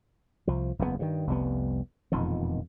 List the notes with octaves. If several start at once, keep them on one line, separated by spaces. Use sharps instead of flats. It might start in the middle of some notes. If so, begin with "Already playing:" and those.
C2 F3
F#1 E2 A2 B3
G2 D#3
F1 C2 G3 B3
E1 F2 A#2 D#3